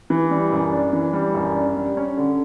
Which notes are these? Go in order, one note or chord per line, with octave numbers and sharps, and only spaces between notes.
E3
G3
F#2
D4
E3
G3
F#2
D4
G3
C#4
D3